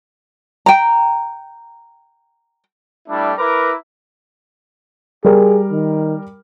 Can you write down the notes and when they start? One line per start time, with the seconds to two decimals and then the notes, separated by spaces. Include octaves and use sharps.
0.66 G5 A#5
3.08 G3 A3 D4 E4
3.38 E4 A#4 B4 A#5 D6
5.24 G3 G#4 A#4
5.71 D#3